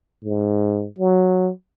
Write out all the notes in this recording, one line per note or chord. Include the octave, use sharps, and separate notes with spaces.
G#2
F#3